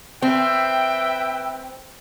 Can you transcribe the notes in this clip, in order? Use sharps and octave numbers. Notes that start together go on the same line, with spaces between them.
C4 B4 E5 G5